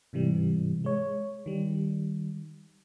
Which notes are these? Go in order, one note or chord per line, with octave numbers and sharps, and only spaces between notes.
G#2 C3 E3 G3
G#3 C#5
D#3 G3